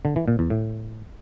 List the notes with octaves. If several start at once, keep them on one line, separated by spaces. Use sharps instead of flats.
D3
E3
A#2
E2
A2